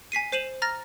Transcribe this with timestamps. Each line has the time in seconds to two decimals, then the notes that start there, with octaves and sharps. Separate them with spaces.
0.12 G#5 B6 C7 D#7
0.32 C5 C7 D#7 E7 F#7
0.62 A#5 F6 A6 A#6